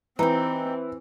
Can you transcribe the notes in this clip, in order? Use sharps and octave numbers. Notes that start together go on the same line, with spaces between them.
E3 C4 D#4 G4